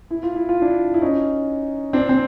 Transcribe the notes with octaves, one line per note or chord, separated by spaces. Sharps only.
E4
F4
E4
F4
D4 E4
E4
C#4 D#4
C4 D4
C4